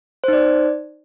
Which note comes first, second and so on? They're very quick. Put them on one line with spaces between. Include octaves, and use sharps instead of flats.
C5 D#4 D5